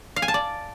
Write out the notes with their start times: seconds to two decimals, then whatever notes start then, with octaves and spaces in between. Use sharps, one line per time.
0.16 F5
0.22 G#5
0.28 A5
0.34 D5